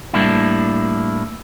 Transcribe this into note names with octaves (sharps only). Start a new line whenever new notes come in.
A2 G3 A#3 D4 E4